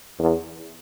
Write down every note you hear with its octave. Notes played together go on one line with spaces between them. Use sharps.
E2